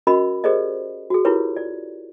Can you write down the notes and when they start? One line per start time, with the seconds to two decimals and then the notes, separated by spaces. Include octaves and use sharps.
0.07 C#4 F#4 A#4 D#5 B5
0.44 G4 G#4 A#4 C5 D5 D#5
1.10 F#4 G#4
1.25 E4 F4 G4 A#4 B4 C#5
1.57 D5